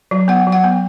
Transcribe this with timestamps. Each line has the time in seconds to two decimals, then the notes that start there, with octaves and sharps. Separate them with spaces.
0.11 F#3
0.28 B3 F#5
0.47 F#3
0.52 F#5
0.64 B3